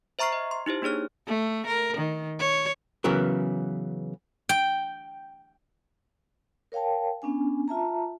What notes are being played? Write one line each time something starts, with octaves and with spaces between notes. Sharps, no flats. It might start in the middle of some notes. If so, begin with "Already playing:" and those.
C5 E5 A#5 C#6 F6 C7
D#5
C6
D#4 E4 G4 C5
A#3 D4 G#4 C#5 F6
A3
A#4
D#3
C#5
C#3 E3 F#3 B3 A#4
G5
A#4 C#5 F5 G5 A5
B3 C#4 D4 G#5
F4 E5 A5 A#5